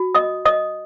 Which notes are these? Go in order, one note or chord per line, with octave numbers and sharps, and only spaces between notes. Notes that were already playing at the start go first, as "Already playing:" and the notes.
Already playing: F#4
D#5 D#6
D#5 D#6